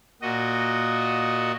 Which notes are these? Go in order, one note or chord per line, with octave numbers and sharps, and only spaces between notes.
A#2 F#4 D#5